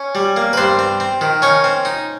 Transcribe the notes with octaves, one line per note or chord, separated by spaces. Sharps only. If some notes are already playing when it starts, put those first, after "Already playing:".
Already playing: C#4 C#5
G3
A#3
B4
G2 C4 C5
C4
C4
D#3
C#4 D#4 C#5
C4
D#4